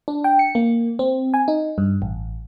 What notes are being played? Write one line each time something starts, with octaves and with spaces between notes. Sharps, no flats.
D4
G5
C#7
A#3
C4
G#5
D#4
G2
A1